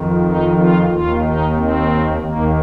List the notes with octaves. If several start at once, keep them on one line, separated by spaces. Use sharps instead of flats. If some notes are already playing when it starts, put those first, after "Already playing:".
Already playing: F2 D#3
D#4
F4
D#2 D#3 F4
D#4
C4
D#2 D#3 A#3